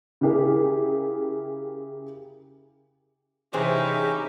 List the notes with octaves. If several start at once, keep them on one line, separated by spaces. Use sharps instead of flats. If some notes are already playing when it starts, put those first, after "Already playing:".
C#3 E4 G4 G#4 A#4
C3 E3 C#4 D#4 E4 G4 G#4 C5